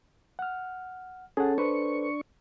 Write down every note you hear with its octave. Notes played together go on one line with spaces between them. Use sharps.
F#5 F6
C#4 G#4 A4 F#5
D4 A4 B4 C5 C#6